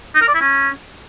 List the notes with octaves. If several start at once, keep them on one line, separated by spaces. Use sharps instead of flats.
D#4
A#4
D5
E4
C#4